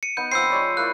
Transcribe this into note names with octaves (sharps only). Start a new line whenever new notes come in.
C#7 D#7
B3 D#4 F#5 G6
F3 C4 E6 G6 C7
G#3 C#5 D5
A#3 E4 D5 F#6